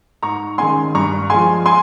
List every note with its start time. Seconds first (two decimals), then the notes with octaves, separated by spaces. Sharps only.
0.22 G#2 A#5 C#6
0.58 D#3 G#3 C#4 G#5 C6
0.95 G2 A#5 C#6
1.30 F3 G#3 G#5 C6
1.66 G#5 C6